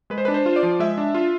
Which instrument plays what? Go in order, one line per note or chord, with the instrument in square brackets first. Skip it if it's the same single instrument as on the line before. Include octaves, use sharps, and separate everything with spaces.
[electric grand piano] G#3 B4
C5
D4 B4
C5
F4
D5
F3
G#3 E5
D4
F4